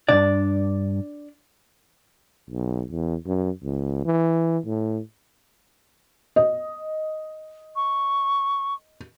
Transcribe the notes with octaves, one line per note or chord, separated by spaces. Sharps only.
B1 G2 D4 D5
B1
E2
F#2
C#2
E3
A2
D#5
C#6